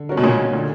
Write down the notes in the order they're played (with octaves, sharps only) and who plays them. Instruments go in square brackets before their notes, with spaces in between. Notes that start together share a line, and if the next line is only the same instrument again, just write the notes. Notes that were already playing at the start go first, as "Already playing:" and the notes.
Already playing: [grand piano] D3
G3 C#4 F#4 A#4
[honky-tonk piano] B2
A#2 C#3
[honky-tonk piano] A#2 [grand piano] D3